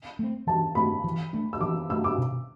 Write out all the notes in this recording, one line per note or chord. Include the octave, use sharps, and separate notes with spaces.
A3 C4
E3 A5
A3 C4 B5
E3
A3 D4
E6
E3 D6
A3 D4 E6
D6
B2